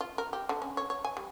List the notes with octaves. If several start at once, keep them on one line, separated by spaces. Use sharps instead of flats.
F4
A#4
G4
D3
C#4
C#5
C#5
G#5
G3